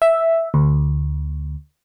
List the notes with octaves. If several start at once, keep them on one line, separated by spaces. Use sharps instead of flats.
E5
D2